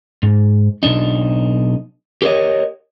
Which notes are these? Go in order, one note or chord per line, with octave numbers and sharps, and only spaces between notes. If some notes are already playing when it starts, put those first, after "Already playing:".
G#2
B1 F#2 D4 D#4
G4 A#4 C5 C#5 D#5